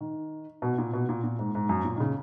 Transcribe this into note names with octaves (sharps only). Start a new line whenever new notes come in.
D#3
B2
A#2
B2
A#2
A#2
G#2
G#2
F#2
A#2
D#3
C#3